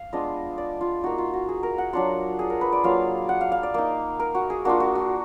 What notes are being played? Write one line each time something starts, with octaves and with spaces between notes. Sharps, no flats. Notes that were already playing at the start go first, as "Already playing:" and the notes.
Already playing: F5
G#3 B3 D4 F4 D#5
D5
F4
A#3 D#4 F#4
F4
F#4
G#4
A#4
F#5
F#3 D4 F4 F#5
G#4
A#4
B4
D5
F#3 A#3 F4 F5
F#5
F5
F5
D5
A#3 D#4
A#4
F#4
G#4
A#3 D4 F4 F#4
F#4
F#4